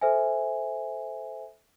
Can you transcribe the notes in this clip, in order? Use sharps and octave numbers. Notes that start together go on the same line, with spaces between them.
A4 C5 E5 G#5